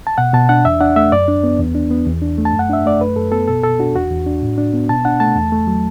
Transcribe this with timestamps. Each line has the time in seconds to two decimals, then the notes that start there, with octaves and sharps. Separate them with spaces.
0.07 A5
0.18 B2 F#5
0.33 B2 A5
0.49 D4 F#5
0.65 E2 E5
0.80 D4 F#5
0.96 A3 E5
1.12 F#2 D5
1.28 D4
1.44 B3
1.59 E2
1.75 D4
1.91 B3
2.06 E2
2.22 D4
2.38 A3
2.45 A5
2.54 F#2
2.59 F#5
2.70 D4 E5
2.86 A3 D5
3.01 F#2 B4
3.16 F#2 A4
3.32 B3 A4
3.48 B2 A4
3.63 B2 A4
3.79 D4 F#4
3.95 E2 F#4
4.11 E2
4.26 D4
4.42 A2
4.58 D4
4.73 B3
4.89 B2 A5
5.05 D4 F#5
5.20 A3 A5
5.36 E2
5.52 A3
5.67 F#3